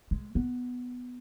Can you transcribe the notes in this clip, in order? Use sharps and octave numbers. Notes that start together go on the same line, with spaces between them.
G#3
B3